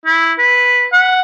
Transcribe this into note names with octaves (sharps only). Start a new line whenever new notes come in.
E4
B4
F#5